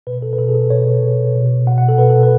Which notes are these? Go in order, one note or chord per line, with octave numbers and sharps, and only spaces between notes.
B2 B4
A4
B4
B2 A4
G#4
A4
B2 C#5
B2
B2
B2 F#5
F#5
A4
B2 B4
A4
B4